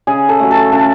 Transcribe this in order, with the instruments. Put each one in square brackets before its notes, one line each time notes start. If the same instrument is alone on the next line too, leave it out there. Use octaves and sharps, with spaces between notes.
[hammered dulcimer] C#3 G#4
A4
F#3 A3
A4
C#3 A4